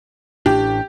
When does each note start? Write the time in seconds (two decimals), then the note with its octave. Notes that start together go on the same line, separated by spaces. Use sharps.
0.46 A1 A2 D4 G4